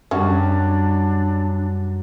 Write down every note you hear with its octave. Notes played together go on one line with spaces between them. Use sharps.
F#2 G3 C#4 D4 F#4 G4